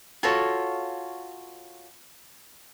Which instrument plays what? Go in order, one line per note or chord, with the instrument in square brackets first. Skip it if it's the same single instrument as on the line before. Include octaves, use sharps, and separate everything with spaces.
[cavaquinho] F4 F#4 A4 C#5